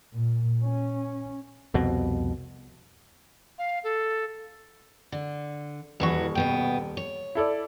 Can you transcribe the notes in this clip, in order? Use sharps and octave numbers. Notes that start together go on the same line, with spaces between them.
A#2
C#4
C2 F2 B2
F5
A4
D3
D#1 E2 E3 F#4 C#6
B2 B3 G5
C#5
E4 A4 D5